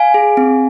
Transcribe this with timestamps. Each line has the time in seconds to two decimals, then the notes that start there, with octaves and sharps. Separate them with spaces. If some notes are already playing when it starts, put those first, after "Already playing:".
Already playing: F5 G#5
0.14 G#4
0.37 C4